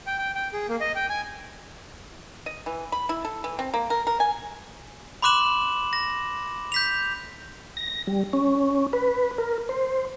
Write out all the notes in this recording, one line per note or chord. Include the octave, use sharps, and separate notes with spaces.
G5
G5
G5
G#4
A#3
D#5
G5
G#5
D#5
E3
B5
E4
A4
E3
C4
A#3
A#4
A#4
G#5
B5 C6 D6 F#6 E7 F#7
A#6
G6 B6 F7
A#6
G3
C#4
B4
A#4
C5